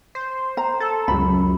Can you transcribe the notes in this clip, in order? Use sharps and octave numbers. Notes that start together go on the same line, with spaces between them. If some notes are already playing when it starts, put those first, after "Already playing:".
C5
A#5
A4
C#2 F#2 B5